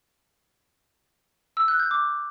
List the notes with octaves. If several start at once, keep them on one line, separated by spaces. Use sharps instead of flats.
E6
F#6
G6
D6